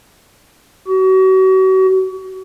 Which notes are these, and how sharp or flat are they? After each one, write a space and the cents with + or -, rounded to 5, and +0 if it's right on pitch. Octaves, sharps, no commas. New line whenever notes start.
F#4 +35